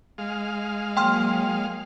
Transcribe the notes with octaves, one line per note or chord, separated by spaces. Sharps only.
G#3 F5
F#3 A#3 G5 C6 F6